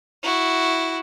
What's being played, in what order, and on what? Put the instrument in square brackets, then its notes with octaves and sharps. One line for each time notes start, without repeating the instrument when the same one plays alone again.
[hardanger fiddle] E4 F#4